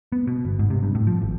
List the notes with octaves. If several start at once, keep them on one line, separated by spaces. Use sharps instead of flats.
B3
B2
G1
G#2
C3
G2
A2
F3
G#1